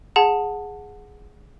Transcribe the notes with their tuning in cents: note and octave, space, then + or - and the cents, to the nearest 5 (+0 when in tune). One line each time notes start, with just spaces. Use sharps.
G#4 +0 F#5 -15 A5 +15